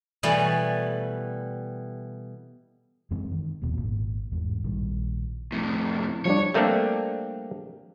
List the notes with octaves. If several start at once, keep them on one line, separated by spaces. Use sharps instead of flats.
B2 E3 G3 A3 B3
F#2 E3 G#3 C4
D#3
D#1 A#1 D#2 B2
G#1 A#2
A1 E2 G#2
A#1 D#3 G3
F2 A2
F3 G3 D4 C#5
G3 A3 A#3 C4 D4 G4